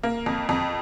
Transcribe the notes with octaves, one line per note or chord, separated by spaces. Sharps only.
A#3
F2
F2